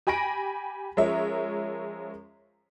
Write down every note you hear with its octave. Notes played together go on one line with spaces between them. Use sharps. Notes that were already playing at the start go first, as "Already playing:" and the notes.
G4 G#5 B5 A#6 D7
F3 G#3 C#4 A#4 C#5 E5